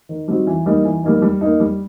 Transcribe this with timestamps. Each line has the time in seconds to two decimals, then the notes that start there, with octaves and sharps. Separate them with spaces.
0.09 D#3
0.28 G3 C4 D#4 F#4
0.47 E3
0.66 G3 A#3 D#4
0.84 E3
1.03 G3 A#3 D#4
1.22 G3
1.41 A#3 D#4
1.60 G3